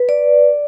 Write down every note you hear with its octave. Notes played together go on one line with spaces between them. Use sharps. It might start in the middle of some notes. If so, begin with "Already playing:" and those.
Already playing: B4
D5